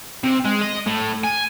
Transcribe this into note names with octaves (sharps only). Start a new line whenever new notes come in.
C3
G#3
D#5
A2
G#5